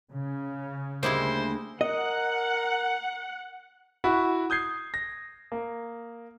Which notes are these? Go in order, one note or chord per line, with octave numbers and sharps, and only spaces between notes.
C#3
D2 G3 G#3 A#3 E4 C5
A#4 D#5 F#5
E4 F#4 B5
D#6 G6 G#6 C7
A#6
A#3